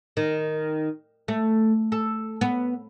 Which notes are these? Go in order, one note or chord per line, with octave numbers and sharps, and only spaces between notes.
D#3
A3
A4
B3